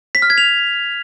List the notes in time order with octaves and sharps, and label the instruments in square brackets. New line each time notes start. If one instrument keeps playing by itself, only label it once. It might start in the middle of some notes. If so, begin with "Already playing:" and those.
[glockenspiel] B6
F6
G#6
F7